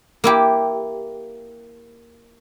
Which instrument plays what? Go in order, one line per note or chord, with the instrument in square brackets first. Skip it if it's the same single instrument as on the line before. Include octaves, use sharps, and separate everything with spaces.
[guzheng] A#3 E4 G4